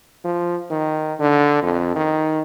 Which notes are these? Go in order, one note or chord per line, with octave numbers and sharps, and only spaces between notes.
F3
D#3
D3
F2
D#3